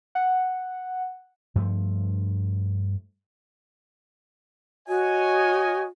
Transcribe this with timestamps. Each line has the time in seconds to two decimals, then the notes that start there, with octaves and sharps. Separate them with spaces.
0.15 F#5
1.55 G2 F3 A3
4.88 F#4 C#5 D#5 G#5